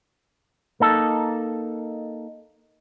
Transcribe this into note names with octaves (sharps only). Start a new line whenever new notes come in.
A#3 D#4 A4